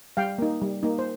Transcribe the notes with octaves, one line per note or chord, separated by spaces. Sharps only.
G3 F5 G5
A#3 D#4
G3
A#3 D#4
C5